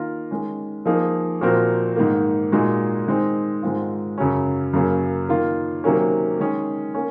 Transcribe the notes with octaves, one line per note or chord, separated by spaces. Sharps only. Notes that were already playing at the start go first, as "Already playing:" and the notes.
Already playing: D#3 A#3 F4 A#4
D#3 G#3 C#4
F3 A#3 D#4 G#4
A#2 F3 C4 F#4 A#4
G#2 D#3 A#3
A#2 G#3 D#4 F#4
D#3 G#3 C4 D#4
G#2 D#3 G#3 C4 F4
F#2 C#3 F#3 C#4
F#2 C#3 F#3 A#3 C#4
D#3 A#3 F4
C3 D#3 F#3 A#3 C#4
D#3 G#3 C#4 G#4
A#3 C#4